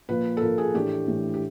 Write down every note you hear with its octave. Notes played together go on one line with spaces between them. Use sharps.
A#2 F3 A#3 B4
A4
A#2 F3 A#3 A#4
G#4
A2 E3 A3 D4 G4
A2 E3 A3 D4
G4